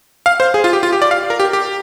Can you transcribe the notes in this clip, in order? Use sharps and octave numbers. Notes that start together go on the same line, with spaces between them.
F5
C5
G#4
F4
G4
F4
G4
D5
F5
A#4
G4
G4